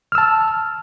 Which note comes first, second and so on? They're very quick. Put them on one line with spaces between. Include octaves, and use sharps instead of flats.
F6 E6 A5